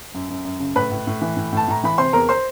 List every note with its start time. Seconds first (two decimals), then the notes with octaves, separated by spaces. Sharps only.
0.14 F#2
0.30 F#2
0.45 F#2
0.60 C#3
0.75 A2 B4 B5
0.91 A2
1.07 A2
1.21 E3
1.37 A2
1.52 A2 A5
1.68 A2 A#5
1.84 E3 B5
1.98 C3 C5 C6
2.13 E2 A#4 A#5
2.29 C5 C6